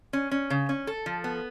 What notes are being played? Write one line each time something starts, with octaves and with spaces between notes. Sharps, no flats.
C#4
C#4
C#3
C#4
A4
F3
B3